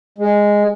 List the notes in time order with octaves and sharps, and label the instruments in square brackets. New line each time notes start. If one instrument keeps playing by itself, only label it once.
[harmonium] G#3